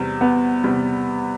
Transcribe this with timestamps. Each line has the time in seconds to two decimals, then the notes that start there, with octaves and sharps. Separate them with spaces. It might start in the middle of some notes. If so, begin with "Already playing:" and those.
Already playing: E2 C3 G3
0.21 B3
0.64 E2 C3 G3